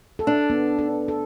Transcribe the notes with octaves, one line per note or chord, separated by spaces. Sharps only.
A4
D4
B3
A4
A4